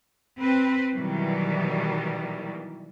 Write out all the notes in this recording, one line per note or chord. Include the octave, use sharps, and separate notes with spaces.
C4 B4
B2 D#3 E3 F#3 G3